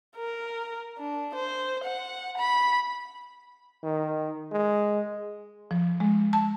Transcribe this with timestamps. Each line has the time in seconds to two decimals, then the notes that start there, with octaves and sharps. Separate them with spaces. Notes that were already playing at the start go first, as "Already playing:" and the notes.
0.17 A#4
0.98 D4
1.35 C5
1.84 F#5
2.38 B5
3.84 D#3
4.52 G#3
5.71 F3
6.00 G#3
6.33 A5